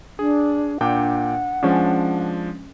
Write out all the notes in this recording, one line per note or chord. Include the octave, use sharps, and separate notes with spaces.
D4 G#4
A#2 D4 F#5 G5 D6
F3 G#3 C#4 D4